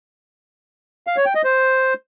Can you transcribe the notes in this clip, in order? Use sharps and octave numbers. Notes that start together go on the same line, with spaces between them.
F5
C#5
G5
D#5
C5